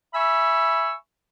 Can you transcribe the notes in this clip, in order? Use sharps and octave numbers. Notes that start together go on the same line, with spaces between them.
E5 G#5 B5 C#6 E6